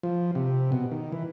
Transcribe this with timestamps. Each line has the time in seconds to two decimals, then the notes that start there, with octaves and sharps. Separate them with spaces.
0.03 F3
0.35 C3
0.72 B2
0.92 D#3
1.12 E3